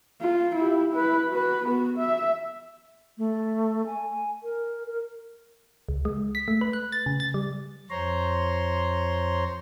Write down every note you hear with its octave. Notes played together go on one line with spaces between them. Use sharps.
F4
E4 G4
E4 B4
F#4 B4
B3 F#4
E5
A3
G#5
A#4
A#4
C#2
G#3
B6
A3
B4
F#6
A6
C#3
A6
G3
F2 C5 C#5 A#5 C6